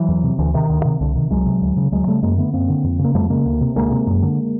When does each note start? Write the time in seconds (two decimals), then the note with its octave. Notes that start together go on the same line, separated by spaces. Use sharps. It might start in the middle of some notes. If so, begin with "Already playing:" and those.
Already playing: E3 F#3
0.08 E2
0.23 C3
0.39 D2 D3 E3
0.54 C3 D#3
0.70 D2
0.85 C3
1.01 C2 D3
1.16 C3 D#3
1.30 C2 F#3 G#3
1.46 C3
1.61 D2
1.77 C#3
1.92 D2 F#3 G#3
2.07 C#3 G3 A3
2.22 F#2 G#3 A#3
2.38 D3 A3 B3
2.53 F#2 A#3 C4
2.69 D3
2.84 F2
2.99 C#3
3.04 A#3
3.15 F2 G3 A3
3.30 C#3 G#3 A#3
3.46 D2
3.61 C3
3.76 D2 G#3 A#3
3.91 C3
4.07 F#2
4.22 D3